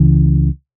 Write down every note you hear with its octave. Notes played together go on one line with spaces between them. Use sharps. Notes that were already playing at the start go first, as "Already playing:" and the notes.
Already playing: C#2 C#3 E3